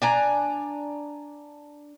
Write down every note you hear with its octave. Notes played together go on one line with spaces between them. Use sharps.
D4 G#5 A#5